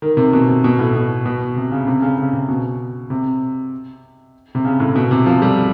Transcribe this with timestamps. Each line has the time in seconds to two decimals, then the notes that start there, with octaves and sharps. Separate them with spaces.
0.02 D#3
0.17 C3
0.33 B2
0.49 C3
0.64 B2
0.79 A2
0.95 B2
1.26 B2
1.56 C3
1.71 C#3
1.87 C3
2.02 C#3
2.18 C#3
2.33 C3
2.49 B2
3.10 C3
4.55 C3
4.65 C#3
4.80 A2
4.96 B2
5.11 C3
5.26 F3
5.42 G3